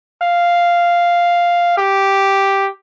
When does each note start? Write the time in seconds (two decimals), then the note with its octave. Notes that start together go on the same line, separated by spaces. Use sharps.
0.22 F5
1.78 G4